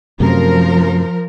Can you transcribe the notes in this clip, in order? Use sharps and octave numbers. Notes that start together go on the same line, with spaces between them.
F#2 C3 F3 A3 A#4